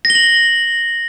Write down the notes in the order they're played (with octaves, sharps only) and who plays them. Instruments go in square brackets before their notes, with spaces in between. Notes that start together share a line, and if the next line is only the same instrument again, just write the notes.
[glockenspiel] A#6
G7
F#7